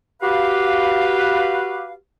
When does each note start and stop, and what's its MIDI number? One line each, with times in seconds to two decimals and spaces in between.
0.22 1.94 66
0.22 1.94 67
0.22 1.94 71
0.22 1.94 77